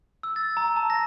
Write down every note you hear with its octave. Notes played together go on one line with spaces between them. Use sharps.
E6
A6
A#5
A5
A#6